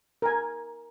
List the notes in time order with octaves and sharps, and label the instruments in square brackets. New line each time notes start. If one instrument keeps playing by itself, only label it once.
[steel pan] A#4 G#5